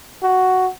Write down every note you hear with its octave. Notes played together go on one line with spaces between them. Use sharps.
F#4